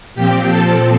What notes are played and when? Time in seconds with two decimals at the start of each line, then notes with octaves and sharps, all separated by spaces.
0.15 A#2 F3 C4 G4 G5
0.49 A4 A5